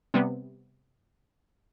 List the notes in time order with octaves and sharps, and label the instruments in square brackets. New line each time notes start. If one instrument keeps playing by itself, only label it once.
[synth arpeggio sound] C3 G3 B3